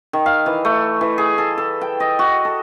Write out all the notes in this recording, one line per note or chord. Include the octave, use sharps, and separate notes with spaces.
D#3
F5
E3
A3
E3
G#4
A4
A4
G5
D#5
F#4
A4